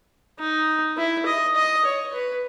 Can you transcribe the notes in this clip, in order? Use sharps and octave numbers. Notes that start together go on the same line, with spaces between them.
D#4
E4
D#5
D#5
C#5
B4